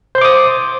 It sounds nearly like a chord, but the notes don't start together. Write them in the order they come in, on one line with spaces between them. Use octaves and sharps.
C5 C6 D6 D#6